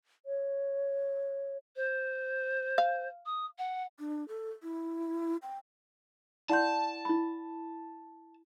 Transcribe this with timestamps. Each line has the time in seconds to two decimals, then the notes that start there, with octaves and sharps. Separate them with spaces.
0.26 C#5
1.76 C5
2.78 F5
3.25 D#6
3.58 F#5
3.99 D4
4.28 A4
4.63 E4
5.42 G5
6.49 E4 D5 F#5 A5 C6 G6
7.05 E4 B5